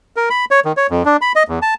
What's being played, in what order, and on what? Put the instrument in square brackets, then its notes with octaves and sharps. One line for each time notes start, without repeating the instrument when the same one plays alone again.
[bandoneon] A#4
B5
C#5
D#3
C#5
F2
D4
B5
D#5
E2
A5